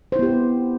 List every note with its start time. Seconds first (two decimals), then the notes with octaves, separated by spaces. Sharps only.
0.12 C5
0.16 E4
0.19 B3
0.23 G4